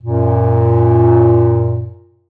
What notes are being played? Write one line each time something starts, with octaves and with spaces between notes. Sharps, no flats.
F#2 A#2